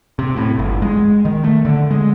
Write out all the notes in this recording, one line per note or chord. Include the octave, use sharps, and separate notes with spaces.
C3
A2
G1
G#3
D#3
A3
D3
G#3